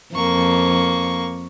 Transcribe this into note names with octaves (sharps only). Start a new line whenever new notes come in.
F2 A#3 C#6